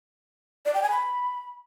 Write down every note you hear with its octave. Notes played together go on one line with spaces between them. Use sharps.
D5
G5
G#5
B5